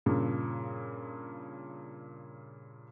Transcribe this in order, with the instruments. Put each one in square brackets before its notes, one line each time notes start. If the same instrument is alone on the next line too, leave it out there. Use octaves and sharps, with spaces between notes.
[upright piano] G2 A#2 C#3